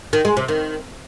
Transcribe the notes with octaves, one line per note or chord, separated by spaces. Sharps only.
D#3
G#3
C3
D#3